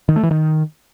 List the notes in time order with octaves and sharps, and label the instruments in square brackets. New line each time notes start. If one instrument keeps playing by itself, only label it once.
[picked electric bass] D#3
A3
E3
D#3